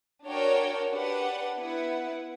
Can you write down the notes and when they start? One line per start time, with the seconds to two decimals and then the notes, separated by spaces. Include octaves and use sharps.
0.24 D4 F#4 A#4 C#5 G5
0.90 D4 G4 B4 F#5
1.55 B3 E4 B4 F#5